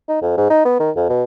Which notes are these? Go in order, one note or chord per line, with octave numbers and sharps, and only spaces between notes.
D#4
F2
G#2
D#4
B3
D#3
F2
B2